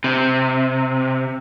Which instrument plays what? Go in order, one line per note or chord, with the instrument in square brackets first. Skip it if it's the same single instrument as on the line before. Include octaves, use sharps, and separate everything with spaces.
[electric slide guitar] C3